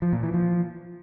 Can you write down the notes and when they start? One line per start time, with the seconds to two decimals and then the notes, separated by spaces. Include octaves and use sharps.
0.02 F3
0.13 A#2
0.23 E3
0.34 F3